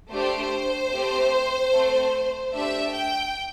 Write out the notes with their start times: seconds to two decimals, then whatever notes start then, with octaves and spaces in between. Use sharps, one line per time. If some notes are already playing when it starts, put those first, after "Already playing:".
0.12 A3 D4 G4 C5
0.93 A3 C4 G4
1.73 A3 C4 A4
2.53 A3 D4 G4 E5
2.94 G5